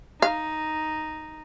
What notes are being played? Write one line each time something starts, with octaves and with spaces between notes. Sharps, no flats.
D#4 F5